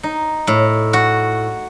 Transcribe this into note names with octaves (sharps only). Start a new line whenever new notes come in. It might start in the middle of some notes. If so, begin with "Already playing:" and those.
D#4
A2
F#4